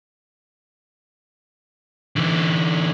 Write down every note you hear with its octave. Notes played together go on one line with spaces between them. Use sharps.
D3 E3